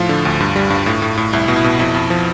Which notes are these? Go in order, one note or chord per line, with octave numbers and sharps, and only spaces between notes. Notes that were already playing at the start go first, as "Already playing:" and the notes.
Already playing: A2 F3 F4
D3
D2
G2
G3
G2
A2
A2
A2
C2 E4
B2
E4
B2
F2 E4
F2
F3